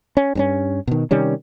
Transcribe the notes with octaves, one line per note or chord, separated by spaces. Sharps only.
C#4
G2 C4 C#4
B2 D#3
C3 D#3 G3 C#4